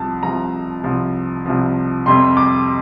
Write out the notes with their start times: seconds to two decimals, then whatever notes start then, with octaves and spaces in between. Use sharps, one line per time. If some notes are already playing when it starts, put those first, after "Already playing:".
Already playing: C2 C3 F3 A5
0.23 C2 C3 F3 A#5
0.84 C2 C3 F3
1.46 C2 C3 F3
2.06 F2 C3 G3 C6
2.37 D6